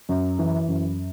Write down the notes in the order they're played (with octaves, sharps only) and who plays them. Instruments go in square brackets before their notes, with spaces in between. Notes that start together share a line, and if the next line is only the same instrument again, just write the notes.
[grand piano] F#2
E3
F#2